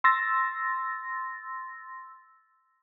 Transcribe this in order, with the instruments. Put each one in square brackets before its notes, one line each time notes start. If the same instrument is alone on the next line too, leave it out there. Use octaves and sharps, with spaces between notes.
[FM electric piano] C6 E6 A6 A#6